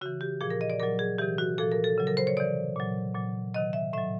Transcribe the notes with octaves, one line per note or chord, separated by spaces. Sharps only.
C#3 E3 F#4
G4
A#2 F3 G#4
A#4
D#5
D5
A#2 F#3 A#4
G#4
C3 E3 G4
F#4
A#2 F3 A4
A#4
A4
C#3 F#3
A#4
C5
C#5
C3 E3 D5
A#2 F#3
A#2 F#3
C3 D#3 F#3 D#5
E5
A2 F#3 E5